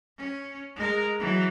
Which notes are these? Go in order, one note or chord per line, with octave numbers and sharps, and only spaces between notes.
C#4
G#3 A#4
E3 F#3